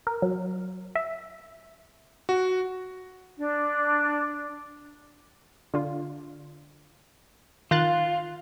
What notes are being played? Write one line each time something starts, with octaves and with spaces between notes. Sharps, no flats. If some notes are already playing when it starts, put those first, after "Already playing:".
A#4
F#3
E5
F#4
D4
D3 F4
D#3 F4 F#6 A6